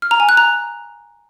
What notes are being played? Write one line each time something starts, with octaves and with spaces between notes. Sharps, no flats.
F6
A#5
G#5
F#6
A#5